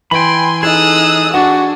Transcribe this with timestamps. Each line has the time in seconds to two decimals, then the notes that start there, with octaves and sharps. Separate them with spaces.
0.11 E3 G5 G#5 B5 C6
0.63 D#4 G#4 A4 D#6 E6 F#6
1.34 D4 F#4 F#5